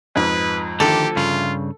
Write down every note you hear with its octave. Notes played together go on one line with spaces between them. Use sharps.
F2 G#2 D#4 B4
D2 D3 D#3 F3 G4 A4
G2 C#3 F4